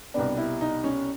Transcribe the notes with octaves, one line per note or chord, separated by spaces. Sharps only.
C2 B2 G3 B3 D4
E4
D#4
C#4